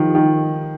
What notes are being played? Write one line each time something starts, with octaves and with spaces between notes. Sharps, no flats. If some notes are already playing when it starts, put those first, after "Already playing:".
Already playing: D#3 F3
D#3